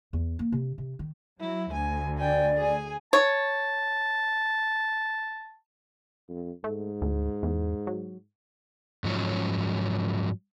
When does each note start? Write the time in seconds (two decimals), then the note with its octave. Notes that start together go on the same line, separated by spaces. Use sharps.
0.13 E2
0.39 A#3
0.52 C3
0.78 C3
0.99 D#3
1.40 F#3 E4
1.73 D2 G#5
2.18 D5 G5 G#5
2.57 G#4 G#5
3.13 C#5 A5
6.29 F2
6.64 G#2 A3
7.02 D2
7.43 E2
7.87 F#3
9.04 G#2 F3 F#3 C#4